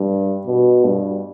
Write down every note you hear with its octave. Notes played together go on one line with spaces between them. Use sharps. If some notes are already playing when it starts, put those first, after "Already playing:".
Already playing: G2
B2
G2